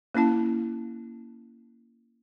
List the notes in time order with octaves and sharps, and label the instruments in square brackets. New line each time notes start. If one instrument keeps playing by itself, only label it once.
[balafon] A#3 C#4 E4 A5